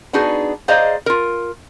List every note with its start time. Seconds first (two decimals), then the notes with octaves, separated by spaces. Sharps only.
0.13 B3 D4 D#4 F#4 G#4
0.68 G#4 C5 D5 D#5 F5 A#5
1.06 F4 A#4